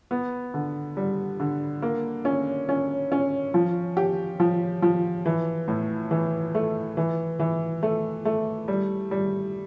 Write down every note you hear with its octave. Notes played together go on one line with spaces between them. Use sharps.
B3
D3
G3
D3
A#3
C#4
C#4
C#4
F3
G4
F3
F3
E3
A2
E3
A3
E3
E3
A3
A3
G3
G3